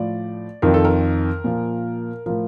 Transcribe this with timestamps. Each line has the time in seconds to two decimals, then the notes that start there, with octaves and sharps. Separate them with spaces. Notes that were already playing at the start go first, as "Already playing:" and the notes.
Already playing: A2 F3 D5
0.62 F2 D#3 A#4
0.74 A4
0.85 A#4
1.44 A#2 F3
2.26 A2 F3 A#4